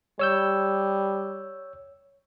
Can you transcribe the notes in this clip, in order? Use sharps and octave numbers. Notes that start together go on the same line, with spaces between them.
G3 C#5 E6 G6